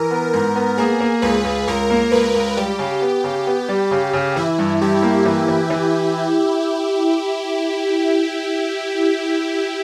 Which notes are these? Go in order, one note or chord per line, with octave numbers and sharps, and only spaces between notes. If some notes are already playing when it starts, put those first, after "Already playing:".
Already playing: E3 A#4
B3
G#2 A#4
B3
A#3 G#4
A#3
C#2 B4
C#2
C#2 A#4
A#3
C#2 B4
C#2
G3 G4
C#3
B3
C#3
B3
G3
C#3
C#3
E3 E4
G2
G2 G4
A#3
E3
E3
E3